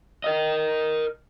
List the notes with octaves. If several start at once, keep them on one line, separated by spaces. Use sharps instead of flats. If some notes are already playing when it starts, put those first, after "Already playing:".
A#4 D#5